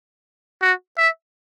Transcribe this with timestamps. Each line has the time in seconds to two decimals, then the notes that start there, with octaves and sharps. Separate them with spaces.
0.62 F#4
0.98 E5